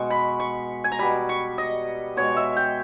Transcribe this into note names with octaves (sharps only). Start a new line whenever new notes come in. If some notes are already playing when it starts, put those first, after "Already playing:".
Already playing: B2 G#3 C#6
B5
C#6
G#5
A#5
B2 G3 B5
C#6
D#5
B2 G#3 C#5
E5
G5